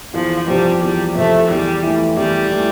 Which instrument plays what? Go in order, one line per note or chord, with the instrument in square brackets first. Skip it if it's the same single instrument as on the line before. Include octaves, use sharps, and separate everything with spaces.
[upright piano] E2 [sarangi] F3
[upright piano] C3 F3 [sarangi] G3
[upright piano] E2 [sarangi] G3
[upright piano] C3 F3 [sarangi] A3
[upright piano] E2 [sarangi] G3
[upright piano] E3 A3
[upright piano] E2 [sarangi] G3
[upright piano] E3 A3